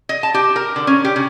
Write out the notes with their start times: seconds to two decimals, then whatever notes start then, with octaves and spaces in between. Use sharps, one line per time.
0.09 D#5
0.23 A5
0.34 G4
0.56 A#4
0.76 D3
0.87 C#4
1.05 G4
1.16 C#3